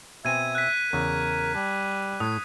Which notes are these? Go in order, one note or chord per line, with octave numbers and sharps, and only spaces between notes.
B2 C4 E5 G#5 G#6 D#7
F#6 B6
E2 C#3 A#4
G3 A5
A2 D#6